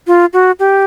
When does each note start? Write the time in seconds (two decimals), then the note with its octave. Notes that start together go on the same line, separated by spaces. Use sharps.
0.07 F4
0.33 F#4
0.59 G4